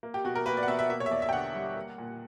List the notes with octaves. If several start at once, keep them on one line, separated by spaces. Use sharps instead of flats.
A#3
G4
B2 F#4
A#4
A#3 B4
D5
F#5
B2 E5
E5
A#3 E5
C#5
E5
E2 D5
E5
G5
D3 F#5
G3
A#3
A#2